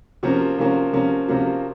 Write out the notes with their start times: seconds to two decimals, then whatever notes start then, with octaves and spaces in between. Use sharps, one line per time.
0.23 C3 F3 A#3 C#4 F#4
0.58 C3 F3 A#3 C#4 F#4
0.93 C3 F3 A#3 C#4 F#4
1.28 C3 F3 A#3 C#4 F#4